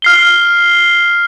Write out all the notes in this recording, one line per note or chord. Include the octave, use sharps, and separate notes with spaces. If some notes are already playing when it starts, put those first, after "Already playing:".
F6 C7 G7